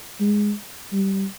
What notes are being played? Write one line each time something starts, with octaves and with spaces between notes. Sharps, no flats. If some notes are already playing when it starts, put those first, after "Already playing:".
G#3
G3